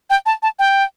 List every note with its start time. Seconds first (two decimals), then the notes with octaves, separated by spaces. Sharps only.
0.10 G5
0.26 A5
0.43 A5
0.59 G5